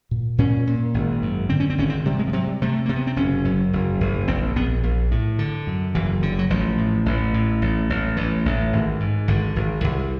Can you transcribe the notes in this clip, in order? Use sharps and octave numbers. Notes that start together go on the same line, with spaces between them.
A#2
A#2 C#4
A#2
G#1
F#2
D3 C4
C#4
C4
G#1 C#4
C4
C3 G3
G#3
F3
C3 F#3
G3
C3 A3
C3 A#3
B3
C4
F#1 C#4
F#2
F#1
F#1
A#1 C4
A#1 B3
A#1
A2
D3
F#2
F#1 E3
D3
F#3
A1 F3
A2
A1
A2
A1
A1
A1 E3
A1
G#1
G#2
G#1 D3
G#1
C2